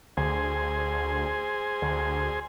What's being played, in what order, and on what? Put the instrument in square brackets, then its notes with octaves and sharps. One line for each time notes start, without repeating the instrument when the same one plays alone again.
[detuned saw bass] D2 [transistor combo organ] G#4 C5 G#5
[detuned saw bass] D2